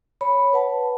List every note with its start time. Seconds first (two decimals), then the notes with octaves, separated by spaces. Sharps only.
0.21 C#5 B5
0.53 B4 F#5 A5